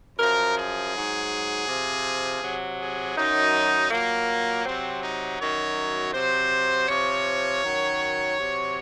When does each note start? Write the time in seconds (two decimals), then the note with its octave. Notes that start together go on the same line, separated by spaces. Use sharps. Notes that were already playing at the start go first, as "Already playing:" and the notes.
0.19 F#2 F3 A#4
0.57 G#4
0.94 G#2 F#3
1.68 C3 F3
2.42 C3 F#3
2.80 G#4
3.16 F#2 D#3 F#3 D#4
3.90 A#2 F#3 A#3
4.66 C3 F#3 C4
5.02 D#4
5.40 F#2 D#3 F#3 C#5
6.14 C3 F#3 C5
6.88 C3 F3 C#5
7.63 F#2 D#3 F#3
8.37 C3 F#3